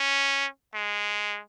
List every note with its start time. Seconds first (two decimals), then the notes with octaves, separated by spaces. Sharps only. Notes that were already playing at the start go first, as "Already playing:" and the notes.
Already playing: C#4
0.74 G#3